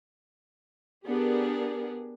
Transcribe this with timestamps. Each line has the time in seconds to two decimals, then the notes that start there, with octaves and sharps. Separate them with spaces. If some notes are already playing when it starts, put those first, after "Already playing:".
1.06 B3 D4 G4 G#4 A#4